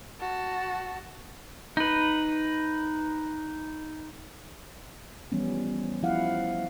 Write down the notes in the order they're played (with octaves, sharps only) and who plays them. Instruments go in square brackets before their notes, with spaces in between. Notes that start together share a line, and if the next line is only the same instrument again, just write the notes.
[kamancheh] F#4 A5
[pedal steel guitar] D#4 B4
[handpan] E3 F3 G3 B3 C#4
F3 E4 F5 F#5